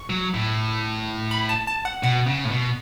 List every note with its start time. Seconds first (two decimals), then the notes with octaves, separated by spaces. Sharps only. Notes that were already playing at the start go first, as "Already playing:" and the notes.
Already playing: C#6
0.10 F#3
0.34 A2
1.31 B5
1.49 A5
1.67 A5
1.85 F#5
2.03 B2 F#5
2.27 C#3
2.45 A2
2.51 B2